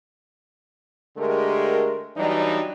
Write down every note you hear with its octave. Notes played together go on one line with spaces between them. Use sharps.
D3 G#3 A3 G4 A#4
E3 F#3 G3 D4 D#4